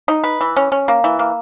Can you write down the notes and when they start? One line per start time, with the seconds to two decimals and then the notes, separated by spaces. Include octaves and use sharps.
0.08 D#4
0.24 B4
0.41 E3
0.56 C#4
0.72 C#4
0.88 A#3
1.04 E3
1.19 A#3